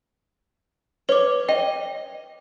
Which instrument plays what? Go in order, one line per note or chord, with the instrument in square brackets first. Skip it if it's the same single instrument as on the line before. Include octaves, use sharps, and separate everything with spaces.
[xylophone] B4 D6 [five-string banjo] C#5
[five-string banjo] D#5 [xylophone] G5